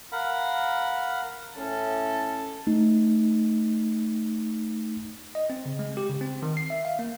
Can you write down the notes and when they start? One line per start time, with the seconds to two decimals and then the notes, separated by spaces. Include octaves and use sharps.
0.12 A#4 F5 F#5 B5
1.56 A2 C#4 A4
2.67 A3 D#4
5.35 D#5
5.50 C4
5.66 C#3
5.79 G#3
5.97 G4
6.09 C#3
6.21 C4
6.43 D#3
6.57 C7
6.70 E5
6.85 F5
6.99 A#3